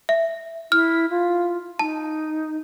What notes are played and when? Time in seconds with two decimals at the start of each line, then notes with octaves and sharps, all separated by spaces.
0.09 E5
0.72 E4 F6
1.10 F4
1.79 D#4 A5